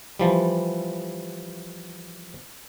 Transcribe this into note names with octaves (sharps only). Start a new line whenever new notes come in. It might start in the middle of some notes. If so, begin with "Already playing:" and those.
E3 F3 G3